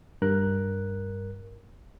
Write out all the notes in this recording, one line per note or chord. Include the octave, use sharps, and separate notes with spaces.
G2 A#4 F#6